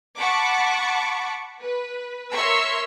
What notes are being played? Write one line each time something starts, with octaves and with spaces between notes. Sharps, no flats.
F#5 A5 B5 C#6 D6
B4
A#4 C#5 E5 C6 C#6 E6